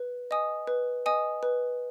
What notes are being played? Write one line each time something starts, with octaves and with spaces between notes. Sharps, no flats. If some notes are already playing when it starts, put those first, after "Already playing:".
Already playing: B4
D#5 G#5 D#6
B4
D#5 G#5 D#6
B4